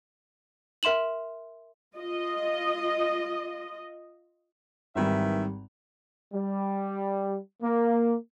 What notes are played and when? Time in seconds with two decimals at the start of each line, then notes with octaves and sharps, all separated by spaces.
0.83 A#4 E5 C6 E7 F#7
1.97 F4 D#5
4.96 G#1 D#3 E3 G3 E5
6.34 G3
7.62 A#3